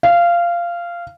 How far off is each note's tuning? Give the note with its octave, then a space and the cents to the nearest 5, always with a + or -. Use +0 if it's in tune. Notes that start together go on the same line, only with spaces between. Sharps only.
F5 -15